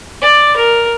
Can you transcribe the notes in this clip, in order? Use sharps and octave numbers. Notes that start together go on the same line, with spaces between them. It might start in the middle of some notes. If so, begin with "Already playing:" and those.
D5
A#4